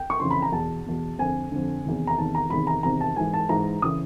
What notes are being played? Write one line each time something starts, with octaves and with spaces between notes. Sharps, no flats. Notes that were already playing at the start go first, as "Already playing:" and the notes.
Already playing: G5
C#6
F2 C#3 E3 C6
B5
A#5
E2 B2 A5
E2 B2
F2 D3 G#5
F2 D3
E2 C3 D#3
A#5
E2 C3 D#3 A5
A#5
E2 C3 D#3 B5
A#5
E2 C3 D#3 A#5
A5
G#2 E3 G#5
A5
G#2 E3 A#5
C#3 E3 D#6